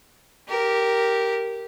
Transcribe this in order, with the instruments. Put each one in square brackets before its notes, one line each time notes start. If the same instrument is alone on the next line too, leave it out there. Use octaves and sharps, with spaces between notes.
[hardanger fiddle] G4 A#4